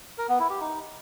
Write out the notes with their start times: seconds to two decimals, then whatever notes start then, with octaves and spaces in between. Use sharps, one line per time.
0.18 A#4
0.29 B3
0.39 E4
0.50 G4
0.60 D#4